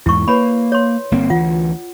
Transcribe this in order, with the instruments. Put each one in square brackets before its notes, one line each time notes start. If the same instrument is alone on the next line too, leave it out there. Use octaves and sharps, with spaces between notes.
[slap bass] E2 G#2 [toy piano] E4 C#6
[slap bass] A#3 [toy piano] B4 C#5 B5
[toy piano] C#5 C6
[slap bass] G1 A#3 C4
[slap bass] D2 E3 [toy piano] F4 F#5